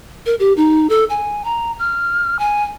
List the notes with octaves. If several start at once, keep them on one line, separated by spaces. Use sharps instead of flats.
A#4
G4
D#4
A4
G#5
A#5
F6
G#5